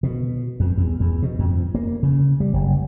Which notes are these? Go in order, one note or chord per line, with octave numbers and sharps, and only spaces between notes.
B2
F2
E2
E2
B2
F2
A#3
C#3
G3
F#1